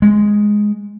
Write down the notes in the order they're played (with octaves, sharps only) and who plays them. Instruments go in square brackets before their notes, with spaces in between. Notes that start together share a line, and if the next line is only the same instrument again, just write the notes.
[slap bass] G#3